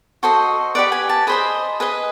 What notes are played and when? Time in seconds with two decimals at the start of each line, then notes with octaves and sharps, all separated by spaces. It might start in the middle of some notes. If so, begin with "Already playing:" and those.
0.23 F#4 A4 C5 D#5
0.75 G4 B4 D5 F#5
0.92 G#5
1.09 A5
1.27 G#4 C5 D#5 B5
1.80 G#4 B4 D#5